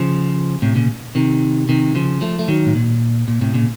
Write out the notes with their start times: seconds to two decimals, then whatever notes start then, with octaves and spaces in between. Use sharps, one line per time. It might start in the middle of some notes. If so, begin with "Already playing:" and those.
Already playing: C#3 F3
0.62 A2 C3
0.75 A#2 C#3
1.15 C3 D#3
1.69 C3 D#3
1.95 C#3 F3
2.21 F3 A3
2.39 A3
2.48 D#3 F#3
2.66 A2
2.75 A#2
3.28 A#2
3.41 A2 C3
3.54 A#2 C#3